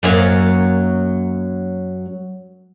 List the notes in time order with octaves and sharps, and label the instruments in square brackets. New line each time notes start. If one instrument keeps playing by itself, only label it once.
[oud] F#2 F#3 A#3